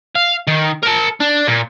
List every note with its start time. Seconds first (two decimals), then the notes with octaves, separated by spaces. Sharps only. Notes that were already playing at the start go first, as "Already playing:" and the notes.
0.15 F5
0.47 D#3
0.83 A#4 A5
1.20 D4
1.48 A#2